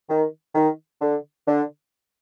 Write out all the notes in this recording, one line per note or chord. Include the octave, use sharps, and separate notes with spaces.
D#3
D#3
D3
D3